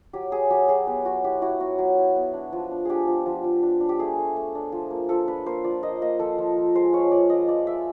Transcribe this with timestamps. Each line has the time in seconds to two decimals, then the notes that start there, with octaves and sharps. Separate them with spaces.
0.13 F#3 G4
0.32 F#3 G#4
0.50 F#3 G4
0.68 F#3 G#4
0.87 B3 G4
1.05 F#3 F#4
1.24 E4 G4
1.42 E4 F#4
1.60 F#3 F#4
1.78 F#3
1.98 E4
2.16 B3
2.34 D4
2.53 F3
2.71 D4
2.85 D4 G4 G#4
3.07 F3
3.26 F3
3.44 F3
3.63 D4
3.80 D4
3.89 G4
3.99 A3 G#4
4.18 A3
4.36 A3
4.55 D4
4.72 F3
4.91 A#3
5.09 F3 A4
5.28 D4 B4
5.46 A#3 C5
5.64 F3 D5
5.82 A#3 D#5
6.02 A#3 D#5
6.19 F3 A4
6.38 F3
6.57 F3
6.75 G#3 C5
6.93 F4 C#5
7.11 F3 D5
7.30 F4 D#5
7.48 F3 D5
7.66 G#3 E5